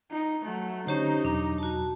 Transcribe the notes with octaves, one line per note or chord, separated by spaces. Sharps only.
D#4
F#3 A3
D3 C#4 D#4 G4 C5 C#5
E2 B2 F#3 D4
F#4 A5